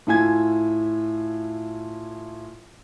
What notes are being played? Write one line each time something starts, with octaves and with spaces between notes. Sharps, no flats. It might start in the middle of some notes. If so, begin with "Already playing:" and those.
A2 E4 F4 G#5 G#6